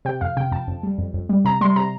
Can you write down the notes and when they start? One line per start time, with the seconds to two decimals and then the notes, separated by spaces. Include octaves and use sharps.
0.05 C3 G5
0.21 F2 F5
0.37 C3 G5
0.52 F2 A5
0.68 F2
0.83 G3
0.98 F2
1.14 F2
1.29 G3
1.45 C3 A#5
1.61 G3 C6
1.76 C3 A#5